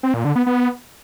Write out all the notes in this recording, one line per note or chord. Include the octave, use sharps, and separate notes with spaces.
C4
A#2
D3
B3
B3